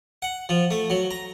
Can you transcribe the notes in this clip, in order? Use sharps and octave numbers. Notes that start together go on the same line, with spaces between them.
F#5
F3
A3
F#3
A#5